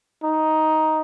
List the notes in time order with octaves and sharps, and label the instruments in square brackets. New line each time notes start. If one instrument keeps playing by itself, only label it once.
[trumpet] D#4